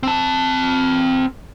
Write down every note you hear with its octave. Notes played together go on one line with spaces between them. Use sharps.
C4 A5